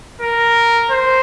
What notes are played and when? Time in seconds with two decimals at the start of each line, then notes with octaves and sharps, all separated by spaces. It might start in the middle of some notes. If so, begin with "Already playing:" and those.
0.21 A#4
0.91 C5